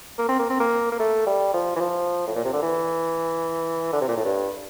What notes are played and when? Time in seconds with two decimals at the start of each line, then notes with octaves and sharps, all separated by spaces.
0.18 A#3
0.29 C4
0.39 A#3
0.50 C4
0.60 A#3
0.92 A#3
0.99 A3
1.27 G3
1.54 F3
1.76 E3
1.80 F3
2.27 A2
2.36 A#2
2.45 C3
2.53 D3
2.62 E3
3.93 D3
4.01 C3
4.08 A#2
4.17 A2
4.25 G2